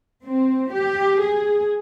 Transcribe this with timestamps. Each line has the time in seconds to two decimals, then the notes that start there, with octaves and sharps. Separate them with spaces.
0.24 C4
0.73 G4
1.21 G#4